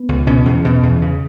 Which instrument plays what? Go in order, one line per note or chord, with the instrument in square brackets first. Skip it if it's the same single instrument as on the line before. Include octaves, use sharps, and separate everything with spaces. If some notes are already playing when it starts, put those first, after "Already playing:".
Already playing: [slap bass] B3
C#2
B2 C#4
E2
B2
E2
C#3